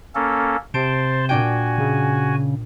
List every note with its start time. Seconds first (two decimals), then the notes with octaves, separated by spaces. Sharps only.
0.15 A#3 C#4 A4
0.74 C3 C5 A5 C6 D7
1.29 A#2 D4 F#4 G5 G#5
1.78 C#3